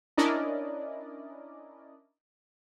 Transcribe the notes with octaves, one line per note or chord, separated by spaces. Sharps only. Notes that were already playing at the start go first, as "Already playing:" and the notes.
C#4 D4 E4 A#4 D5 D#5